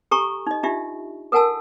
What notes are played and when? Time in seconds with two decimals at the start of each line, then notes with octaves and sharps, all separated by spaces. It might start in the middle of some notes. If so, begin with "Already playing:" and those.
0.11 G4 A4 G#5 A#5 C#6
0.47 D#4 D#5
0.63 D4 D#4 F4 G4 E5
1.32 A4 A#4 F#5 G#5 A5 E6